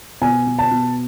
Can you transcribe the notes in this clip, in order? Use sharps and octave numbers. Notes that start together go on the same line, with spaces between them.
B2 G#5
B2
A5
B2